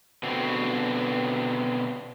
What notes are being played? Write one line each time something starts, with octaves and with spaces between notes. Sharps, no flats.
B2 D3 C4